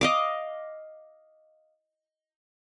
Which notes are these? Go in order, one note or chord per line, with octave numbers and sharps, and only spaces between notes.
D#5 F5 D6